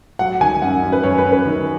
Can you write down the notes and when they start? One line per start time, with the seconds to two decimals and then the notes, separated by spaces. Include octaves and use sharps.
0.19 F#3 F#5
0.41 D#3 G#5
0.62 F#2 F#5
0.82 F#2
0.92 B4
1.03 F#2 C#5
1.18 B4
1.25 F#2
1.32 B4
1.46 D#3